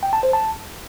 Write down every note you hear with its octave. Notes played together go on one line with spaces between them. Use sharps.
G5
A5
C5
A5